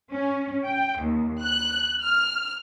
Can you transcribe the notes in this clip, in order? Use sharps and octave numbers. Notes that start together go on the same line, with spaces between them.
C#4
G5
D#2
F#6
F6